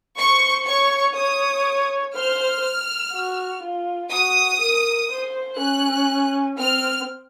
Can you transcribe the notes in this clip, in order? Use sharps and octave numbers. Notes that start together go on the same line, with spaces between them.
C5 C#6
C#5 C#6
C#5 D#6
C5 F6
F#4
F4
F#4 D#6
A#4
C5
C#4 F#6
C4 F6